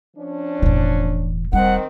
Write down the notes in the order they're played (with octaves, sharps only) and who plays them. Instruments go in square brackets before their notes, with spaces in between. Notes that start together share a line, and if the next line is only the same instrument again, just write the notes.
[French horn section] F3 C#4 D4
[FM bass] E1 [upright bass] A2 E3
[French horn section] D#3 C4 [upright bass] G3 [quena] F#5